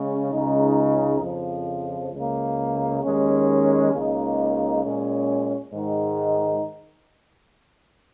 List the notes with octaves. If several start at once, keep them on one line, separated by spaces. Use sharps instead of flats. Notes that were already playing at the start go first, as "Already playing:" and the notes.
Already playing: C#3 G#3 C#4
C#2 C#3 G#3 D#4
F2 C#3 F3
C#2 C#3 A#3
D#2 D#3 G#3 C#4
C#2 C#3 A#3 D#4
A#2 G#3 C#4
G#2 D#3 G#3 D#4